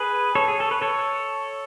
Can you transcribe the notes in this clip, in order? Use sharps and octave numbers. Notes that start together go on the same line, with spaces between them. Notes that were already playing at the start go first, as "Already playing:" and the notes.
Already playing: G#4 B4
A4 C#5
G#4
A4
B4
A4 C#5